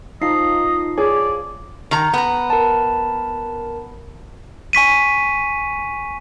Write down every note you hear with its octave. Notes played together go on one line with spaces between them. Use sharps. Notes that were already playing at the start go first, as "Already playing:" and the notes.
F3 D#4 F4 D#5 A#5 C7
G#4 C#5 D5
D#3 A#5
B3 A#5
A#4 A5
G#5 C#6 B6 D#7